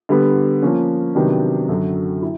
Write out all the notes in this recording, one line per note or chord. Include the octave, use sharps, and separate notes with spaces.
D3 G3 B3
F3 A#3 C#4
C3 D#3 F#3 B3 D4
F#2 D3 F#3
E4